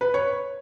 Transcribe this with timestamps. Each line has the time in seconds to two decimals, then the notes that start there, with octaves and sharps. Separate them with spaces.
0.01 B4
0.14 C#5